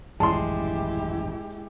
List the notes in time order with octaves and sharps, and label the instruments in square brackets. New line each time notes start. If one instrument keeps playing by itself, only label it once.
[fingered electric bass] D#1 A1 F#2 [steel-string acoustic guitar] G#3 [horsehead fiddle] E4 G4 [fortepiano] A5 C6